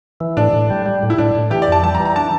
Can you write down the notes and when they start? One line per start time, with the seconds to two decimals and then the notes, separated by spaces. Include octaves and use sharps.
0.20 E3
0.37 A2 D4
0.53 A2
0.70 G3
0.86 G3
1.03 A2
1.10 E4
1.18 A2 D4
1.35 A2
1.50 E3 G4
1.62 D5
1.68 F2 A5
1.84 G3 A5
1.95 A#5
2.00 E3
2.05 A#5
2.16 D4 A5